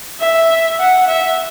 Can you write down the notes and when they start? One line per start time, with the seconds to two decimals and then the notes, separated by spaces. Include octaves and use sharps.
0.20 E5
0.79 F#5
1.08 E5